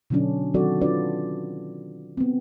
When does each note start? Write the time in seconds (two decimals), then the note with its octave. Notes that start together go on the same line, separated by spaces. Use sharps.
0.10 B2 D3 F#3 C#4 D4
0.54 D#3 F#3 C4 F#4 A4 D5
0.81 C#4 D4 F4 B4 D5
2.17 B3 C4